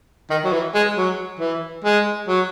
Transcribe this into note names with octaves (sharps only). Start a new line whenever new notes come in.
D#3
F#3
E3
G#3
F#3
E3
G#3
F#3